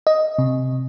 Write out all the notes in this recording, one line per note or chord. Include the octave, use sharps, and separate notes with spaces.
D#5
C3